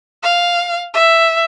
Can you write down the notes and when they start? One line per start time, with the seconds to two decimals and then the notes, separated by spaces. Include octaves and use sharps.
0.24 F5
0.94 E5